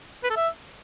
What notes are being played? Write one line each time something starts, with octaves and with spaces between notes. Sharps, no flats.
B4
A4
E5